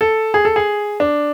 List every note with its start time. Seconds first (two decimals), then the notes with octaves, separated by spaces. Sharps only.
0.01 A4
0.34 G#4
0.45 A4
0.56 G#4
1.00 D4